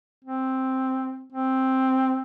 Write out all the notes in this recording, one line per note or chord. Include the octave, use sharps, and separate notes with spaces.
C4
C4